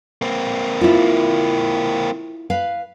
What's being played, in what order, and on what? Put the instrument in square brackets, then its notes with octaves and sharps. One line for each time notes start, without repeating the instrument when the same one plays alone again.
[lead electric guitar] A#3 C4
[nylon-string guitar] E4 F4
B4 F5